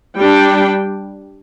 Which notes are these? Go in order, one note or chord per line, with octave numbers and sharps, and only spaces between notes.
G3 D4 G5